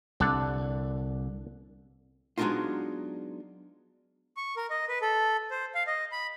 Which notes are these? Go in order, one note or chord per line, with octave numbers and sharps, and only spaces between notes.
C2 D3 D4 F#5
F#3 G#3 B3 D4 D#4 F4
C#6
A#4
D#5
B4
A4
C5
F5
D#5
B5